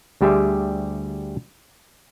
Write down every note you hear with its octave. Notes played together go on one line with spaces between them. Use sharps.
D2 G3 G4 G#4 E5